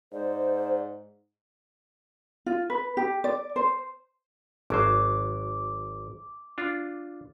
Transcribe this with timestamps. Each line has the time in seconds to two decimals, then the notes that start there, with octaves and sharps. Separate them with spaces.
0.13 G#2 C5 D5
2.46 F4
2.70 B4
2.97 G4
3.24 D5
3.56 C5
4.70 G#1 F#3 C5 D6
6.58 D4 F4